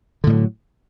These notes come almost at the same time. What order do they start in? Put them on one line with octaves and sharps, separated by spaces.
D3 A2 G3 F#3